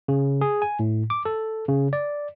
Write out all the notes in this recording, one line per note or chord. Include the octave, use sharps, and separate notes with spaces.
C#3
G#4
G#5
A2
D6
A4
C#3
D5